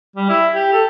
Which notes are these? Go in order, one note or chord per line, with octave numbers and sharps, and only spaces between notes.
G3
E4
G4
A4